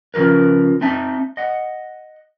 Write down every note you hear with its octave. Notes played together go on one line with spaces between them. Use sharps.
C#3 F3 G4 A#4 B4
C4 D#4 E5 A5
D#5 F#5